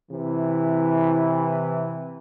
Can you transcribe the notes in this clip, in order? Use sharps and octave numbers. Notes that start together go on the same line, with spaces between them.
C3 E3